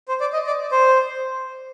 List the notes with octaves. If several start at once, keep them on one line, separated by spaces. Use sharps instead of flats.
C5
D5
D#5
D5
C5